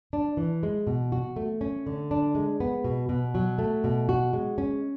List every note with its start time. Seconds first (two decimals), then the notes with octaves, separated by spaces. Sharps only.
0.13 D4
0.37 E3
0.63 G#3
0.87 B2
1.12 F#4
1.36 A3
1.61 C#4
1.86 D3
2.11 D4
2.35 G#3
2.60 B3
2.84 B2
3.09 B2
3.35 F#3
3.58 A3
3.84 B2
4.09 F#4
4.33 G#3
4.58 C#4